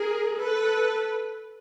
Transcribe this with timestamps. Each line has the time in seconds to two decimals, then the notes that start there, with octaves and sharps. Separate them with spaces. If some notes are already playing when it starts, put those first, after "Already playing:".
Already playing: G#4 A#4
0.37 A4 B4